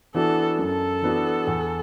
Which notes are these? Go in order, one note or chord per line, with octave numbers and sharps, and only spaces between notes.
E3 B3 D4 F#4 A4
F#2 A4
E3 B3 D4 F#4
E2